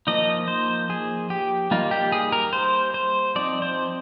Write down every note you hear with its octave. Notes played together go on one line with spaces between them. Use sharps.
F3 A#3 D#4 D#5
C5
G#4
G4
G3 A#3 D#4 F4
G4
G#4
A#4
C5
C5
F3 C4 D#4 D5
C5